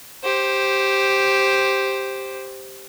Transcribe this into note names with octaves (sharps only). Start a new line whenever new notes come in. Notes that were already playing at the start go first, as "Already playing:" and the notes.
G4 C5